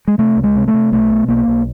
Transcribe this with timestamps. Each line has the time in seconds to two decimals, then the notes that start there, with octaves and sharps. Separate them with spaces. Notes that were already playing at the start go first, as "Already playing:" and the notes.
0.08 G#3
0.18 C3 A3
0.37 C#2
0.43 G#3
0.56 C3
0.68 A3
0.74 C3
0.92 B1 A3
1.10 B2
1.28 B1 A#3
1.48 B1